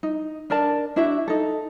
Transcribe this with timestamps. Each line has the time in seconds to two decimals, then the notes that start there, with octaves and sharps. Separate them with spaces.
0.03 D#4
0.50 D4 A#4 D5 A5
0.96 D4 E4 F#4 E5
1.28 D#4 A4